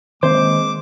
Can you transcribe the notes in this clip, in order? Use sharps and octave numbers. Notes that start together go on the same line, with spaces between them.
D#3 G#3 A#3 C4 C5 D6